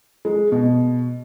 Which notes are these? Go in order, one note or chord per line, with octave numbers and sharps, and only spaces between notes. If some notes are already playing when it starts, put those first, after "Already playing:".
G#3
B2